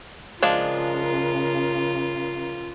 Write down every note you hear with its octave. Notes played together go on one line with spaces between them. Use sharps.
C#3 F3 G#3 D4 F4 A#4